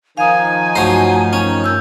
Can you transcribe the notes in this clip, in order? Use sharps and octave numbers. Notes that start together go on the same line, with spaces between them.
D#3 F3 D#4 F5 G#5 D#6
G2 F#3 A3 C5
C#4
G2 D#3 E6 G6